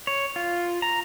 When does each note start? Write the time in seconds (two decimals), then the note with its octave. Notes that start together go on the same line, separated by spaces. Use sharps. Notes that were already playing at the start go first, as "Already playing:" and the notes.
0.07 C#5
0.36 F4
0.82 A#5